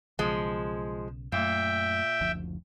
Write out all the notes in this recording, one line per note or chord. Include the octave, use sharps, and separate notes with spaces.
B1 C#3 F3 G#3
F#2 A#2 A3 E5 G5
F#1 D2 F3